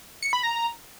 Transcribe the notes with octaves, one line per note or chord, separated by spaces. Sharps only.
C#7
B5
A#5